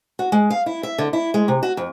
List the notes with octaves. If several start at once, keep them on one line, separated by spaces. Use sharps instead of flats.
F#4
G#3
F5
E4
E5
D3
E4
G#3
C3
F#4
F2